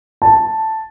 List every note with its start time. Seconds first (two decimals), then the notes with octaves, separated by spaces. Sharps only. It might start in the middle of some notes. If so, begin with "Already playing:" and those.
0.22 A5